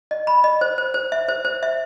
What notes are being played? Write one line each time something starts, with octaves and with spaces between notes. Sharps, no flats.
D#5
B5
D#5
C5
C5
C5
E5
C5
C5
E5